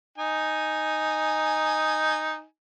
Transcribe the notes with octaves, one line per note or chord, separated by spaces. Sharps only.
D#4 G#5